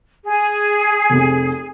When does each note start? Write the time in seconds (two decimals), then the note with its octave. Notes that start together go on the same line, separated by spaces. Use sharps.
0.25 G#4
1.10 F1 C3